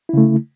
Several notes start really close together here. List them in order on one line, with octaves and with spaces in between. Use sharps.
E4 C#3 A3